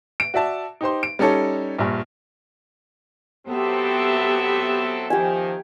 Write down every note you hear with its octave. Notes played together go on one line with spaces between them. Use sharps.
D7
F#4 D5 E5 A5
D#4 G4 C5 C6
D7
G3 C#4 D#4 A4 C#5
A#1 G2
F#3 B3 C4 G4 A4 E5
D#3 F3 G4 G#5